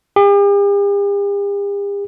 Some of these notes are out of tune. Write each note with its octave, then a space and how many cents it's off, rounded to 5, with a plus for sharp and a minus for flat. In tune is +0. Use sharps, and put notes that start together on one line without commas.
G4 +45